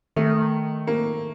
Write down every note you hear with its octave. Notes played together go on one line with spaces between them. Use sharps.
D#3 A3
A#3